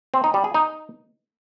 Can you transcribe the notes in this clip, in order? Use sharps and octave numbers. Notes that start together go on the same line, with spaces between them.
C4
D#4
G3
G#4
D#4